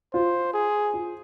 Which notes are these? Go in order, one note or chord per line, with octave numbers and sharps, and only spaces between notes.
F4 C5
G#4
F4